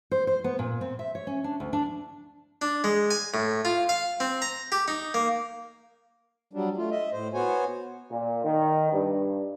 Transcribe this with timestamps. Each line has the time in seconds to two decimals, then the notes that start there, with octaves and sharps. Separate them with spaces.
0.11 C5
0.27 C5
0.44 B3
0.59 A#2
0.81 C4
0.99 E5
1.15 C#5
1.27 C#4
1.44 D4
1.60 D2
1.73 D4
2.62 D4
2.84 G#3
3.10 G#5
3.34 A2
3.65 F4
3.89 F5
4.20 C4
4.42 A#5
4.72 G4
4.88 D#4
5.14 A#3
6.53 F#3 G3 D4
6.77 A3 F4
6.91 D#5 E5
7.13 A2 C5
7.34 B3 F#4 C5 C#5 G#5
8.10 A#2
8.45 D#3
8.93 G2